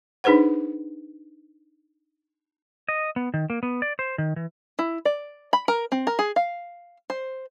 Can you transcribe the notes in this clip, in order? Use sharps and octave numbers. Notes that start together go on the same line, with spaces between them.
D4 D#4 G#4 B4 C5 F#5
D#5
B3
D#3
A#3
B3
D5
C5
D#3
E3
E4
D5
B5
A#4
C4
A#4
G#4
F5
C5